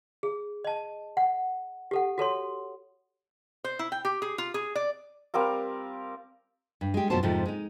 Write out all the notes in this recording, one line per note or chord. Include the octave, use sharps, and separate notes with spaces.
G#4
D#5 A5
F#5
G4 A4 F#5
F#4 A4 C#5 C6
C5
E4
G5
G4
G#4
F4
G#4
D5
G3 C4 A#4 F5
G2
G#3 G4
F#2 B2 F4 F#4 C5 A5
F2 G#2 C3 F3 G#3 A3
G#3 D#4